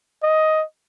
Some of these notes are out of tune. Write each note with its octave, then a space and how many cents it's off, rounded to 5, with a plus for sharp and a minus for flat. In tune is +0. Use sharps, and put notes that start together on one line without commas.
D#5 +10